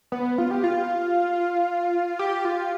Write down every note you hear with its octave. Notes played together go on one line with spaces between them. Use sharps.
B3
F4
G4
F4
G4
F4